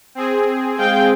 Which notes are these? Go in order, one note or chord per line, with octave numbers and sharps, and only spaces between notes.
C4 G#4
G#3 F5 G5